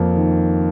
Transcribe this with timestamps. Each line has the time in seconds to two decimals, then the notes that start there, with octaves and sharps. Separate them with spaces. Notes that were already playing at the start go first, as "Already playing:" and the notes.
Already playing: F2 A#3
0.16 D#3